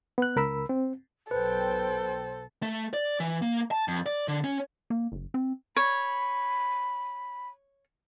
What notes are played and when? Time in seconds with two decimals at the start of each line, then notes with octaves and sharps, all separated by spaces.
0.18 B3 F#6
0.36 C#2 A#4 B5 E6
0.69 C4
1.31 B1 A4 B4 C5 G5
2.62 A3
2.94 D5
3.20 E3
3.42 A#3
3.71 A5
3.88 F2
4.06 D5
4.28 D3
4.44 C#4
4.90 A#3
5.12 F#1
5.34 C4
5.76 C#5 B5